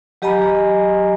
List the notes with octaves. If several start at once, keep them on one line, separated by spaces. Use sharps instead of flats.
F#3 G4 D#5 G#5 A#5 B5